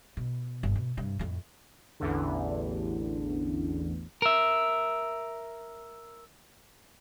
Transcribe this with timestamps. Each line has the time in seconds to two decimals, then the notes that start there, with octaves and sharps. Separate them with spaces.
0.17 B2
0.63 G1
0.76 B2
0.97 G2 C3
1.19 F2 A2
2.00 A1 E2 D3
4.22 A#4 E5